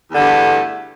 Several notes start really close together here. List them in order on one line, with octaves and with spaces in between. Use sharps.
E2 D3 G2 A3